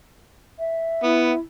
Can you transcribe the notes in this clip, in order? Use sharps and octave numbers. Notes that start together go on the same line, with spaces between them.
E5
B3 E4